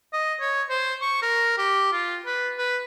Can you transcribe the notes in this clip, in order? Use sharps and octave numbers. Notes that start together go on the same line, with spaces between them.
D#5
C#5
C5
C#6
A#4
G4
F4
B4
B4